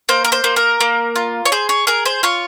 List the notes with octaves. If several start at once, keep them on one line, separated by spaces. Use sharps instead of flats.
A#3 C5
A#4
C5
A#3
A#4
A#3
F4
C#5
G#4 C5
C#5
G#4 A#4
C5
F4 C#5